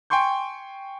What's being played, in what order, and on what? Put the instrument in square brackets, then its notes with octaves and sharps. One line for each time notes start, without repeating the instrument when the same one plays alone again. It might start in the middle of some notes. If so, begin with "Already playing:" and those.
[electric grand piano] G5 G#5 C6 C#6 G6